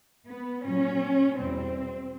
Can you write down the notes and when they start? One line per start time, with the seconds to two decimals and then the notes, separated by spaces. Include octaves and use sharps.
0.27 B3
0.64 A#2 F#3 C#4
1.36 E2 B2 G3 C4